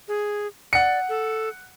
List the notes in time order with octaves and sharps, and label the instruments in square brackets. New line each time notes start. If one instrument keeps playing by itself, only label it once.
[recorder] G#4
[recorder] D5 [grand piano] F#5 C#7
[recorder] A4